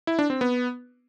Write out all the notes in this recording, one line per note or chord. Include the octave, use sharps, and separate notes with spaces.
E4
D4
C4
B3